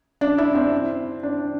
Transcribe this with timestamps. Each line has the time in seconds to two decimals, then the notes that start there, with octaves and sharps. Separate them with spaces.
0.21 D4
0.38 E4
0.55 C4
1.23 D4